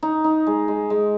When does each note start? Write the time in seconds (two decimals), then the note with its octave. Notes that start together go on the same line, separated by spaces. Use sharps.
0.03 D#4
0.24 D#4
0.47 G#3
0.68 G#3
0.90 G#3